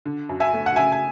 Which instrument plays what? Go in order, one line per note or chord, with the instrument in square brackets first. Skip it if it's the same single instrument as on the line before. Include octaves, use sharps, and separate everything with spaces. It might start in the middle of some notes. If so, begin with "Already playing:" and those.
[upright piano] D3
F#2
E5 G#5
A3
F#5
C#3 E5 G#5
G#5